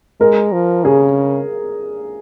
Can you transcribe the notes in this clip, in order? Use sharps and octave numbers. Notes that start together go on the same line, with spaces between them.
G#3 A#4
F3
C#3 G#4